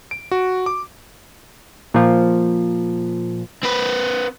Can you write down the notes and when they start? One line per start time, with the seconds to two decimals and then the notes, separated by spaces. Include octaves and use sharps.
0.11 D7
0.31 F#4
0.66 D6
1.94 A#2 F3
3.64 C4 B4